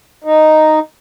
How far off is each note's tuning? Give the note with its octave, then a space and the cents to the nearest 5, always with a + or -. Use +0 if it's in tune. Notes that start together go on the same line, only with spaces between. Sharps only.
D#4 -5